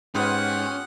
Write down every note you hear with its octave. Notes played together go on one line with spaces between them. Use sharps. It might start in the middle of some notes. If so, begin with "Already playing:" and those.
G#2 B3 C#4 F4 G4 F#5